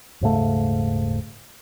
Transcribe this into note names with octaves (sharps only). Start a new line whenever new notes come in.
D#1 G#2 C#3 A3